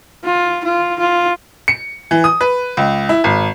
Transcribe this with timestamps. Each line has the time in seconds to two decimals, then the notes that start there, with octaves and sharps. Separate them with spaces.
0.25 F4
0.65 F4
1.00 F4
1.68 C#7
2.11 E3
2.24 D#6
2.41 B4
2.77 C#2
3.09 E4
3.24 G#1